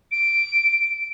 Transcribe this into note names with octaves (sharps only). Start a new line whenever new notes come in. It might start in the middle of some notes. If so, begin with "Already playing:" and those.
D7